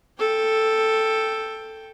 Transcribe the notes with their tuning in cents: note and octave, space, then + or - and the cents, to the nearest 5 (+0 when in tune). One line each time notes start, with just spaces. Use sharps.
A4 +0 G5 +10